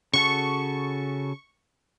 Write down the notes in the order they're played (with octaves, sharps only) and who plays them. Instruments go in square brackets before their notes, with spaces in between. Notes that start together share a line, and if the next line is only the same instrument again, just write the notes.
[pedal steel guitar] C#3 F#4 A4 [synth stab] C#6